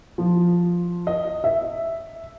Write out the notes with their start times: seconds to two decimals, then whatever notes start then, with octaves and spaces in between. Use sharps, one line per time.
0.18 F3
1.07 D#5
1.44 E5